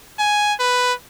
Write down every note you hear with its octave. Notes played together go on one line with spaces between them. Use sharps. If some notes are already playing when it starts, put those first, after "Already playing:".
G#5
B4